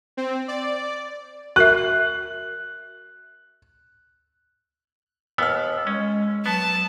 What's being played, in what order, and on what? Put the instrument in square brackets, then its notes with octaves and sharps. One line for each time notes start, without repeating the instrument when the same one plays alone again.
[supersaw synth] C4
D5
[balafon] F#4 A#4 E5 [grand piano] F#6
[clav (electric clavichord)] D#2 B3 [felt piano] E6 F6
[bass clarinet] G#3 [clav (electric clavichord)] C#4
[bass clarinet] F#3 [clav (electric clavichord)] B3 [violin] A5